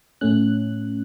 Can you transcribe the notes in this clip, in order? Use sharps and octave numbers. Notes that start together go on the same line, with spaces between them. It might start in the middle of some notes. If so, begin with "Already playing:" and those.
A2 A3 C#4 F#6